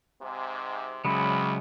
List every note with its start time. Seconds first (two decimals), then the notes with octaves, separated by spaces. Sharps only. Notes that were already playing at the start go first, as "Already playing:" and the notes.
0.21 G#2 C3
1.05 C2 C#3 F#3 G#3 B5